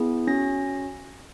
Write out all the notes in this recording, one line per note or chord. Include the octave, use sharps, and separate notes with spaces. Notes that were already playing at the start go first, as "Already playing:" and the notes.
Already playing: B3 E4 G#4
C#4 F#4 A#6